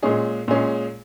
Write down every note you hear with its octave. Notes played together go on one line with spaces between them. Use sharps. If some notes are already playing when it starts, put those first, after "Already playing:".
A#2 G#3 C#4 G#4
A#2 G#3 C#4 G#4